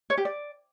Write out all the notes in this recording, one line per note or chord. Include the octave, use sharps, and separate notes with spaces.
C#5
G4
D5